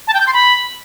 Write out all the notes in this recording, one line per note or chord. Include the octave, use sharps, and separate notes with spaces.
A5
G5
G6
C6
B5